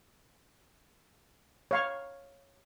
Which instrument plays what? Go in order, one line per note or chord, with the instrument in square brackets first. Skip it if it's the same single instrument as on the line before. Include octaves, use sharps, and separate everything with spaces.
[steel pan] C#5 F5 C#6